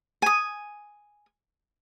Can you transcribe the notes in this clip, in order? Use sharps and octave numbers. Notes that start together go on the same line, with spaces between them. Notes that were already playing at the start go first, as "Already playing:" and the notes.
G#5 D#6